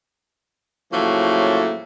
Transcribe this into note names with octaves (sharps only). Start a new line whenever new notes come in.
A2 C#3 F3 F#3 A3 A#3